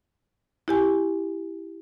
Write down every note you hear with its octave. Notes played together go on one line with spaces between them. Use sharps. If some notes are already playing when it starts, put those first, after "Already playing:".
E4 G4 G#5